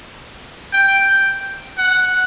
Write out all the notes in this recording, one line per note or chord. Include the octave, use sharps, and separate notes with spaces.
G5
F#5